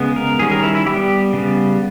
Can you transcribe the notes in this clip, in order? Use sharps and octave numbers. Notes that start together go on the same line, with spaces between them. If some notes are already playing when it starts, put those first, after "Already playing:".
Already playing: C#3 G#3 B3
A#4
D#3 G3 C#4 G#4
A#4
E4
E4
G3 B3 G4
C#3 G3 B3